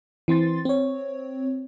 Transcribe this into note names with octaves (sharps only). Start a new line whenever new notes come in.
E3 C4 C6 A6
C4 C#5